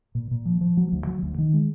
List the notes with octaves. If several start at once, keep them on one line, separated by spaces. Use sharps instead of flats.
A#2
A#2
F3
F3
F#3
D2
F#3
D2
D#3
G#3